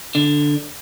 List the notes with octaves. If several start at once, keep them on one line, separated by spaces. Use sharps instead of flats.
D3